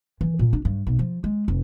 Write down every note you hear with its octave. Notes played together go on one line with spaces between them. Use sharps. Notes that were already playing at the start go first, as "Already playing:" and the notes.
E3
A#2
D4
G2
B1
F3
G#3
F1